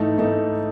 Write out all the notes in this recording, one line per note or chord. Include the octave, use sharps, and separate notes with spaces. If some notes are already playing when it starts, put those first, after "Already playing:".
Already playing: G#2 E3 A3 D#4 A4
G#2 E3 A3 D#4 A4